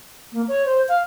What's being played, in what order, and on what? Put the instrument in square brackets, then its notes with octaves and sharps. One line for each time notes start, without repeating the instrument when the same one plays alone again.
[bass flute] A#3
C#5
C5
F5